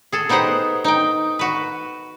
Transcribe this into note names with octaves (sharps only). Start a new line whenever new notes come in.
G#4 A4
B3 D#4 G4 C5 F#5
D#4 G5
F#4 B4